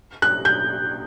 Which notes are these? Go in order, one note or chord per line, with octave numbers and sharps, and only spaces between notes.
F#6
G6